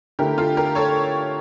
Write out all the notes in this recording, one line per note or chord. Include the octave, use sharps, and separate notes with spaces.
D3 A3 E4 G4 A#4
F4 A4
G4 A#4
A4 C#5